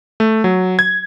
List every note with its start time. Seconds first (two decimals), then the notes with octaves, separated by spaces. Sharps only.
0.20 A3
0.44 F#3
0.79 G#6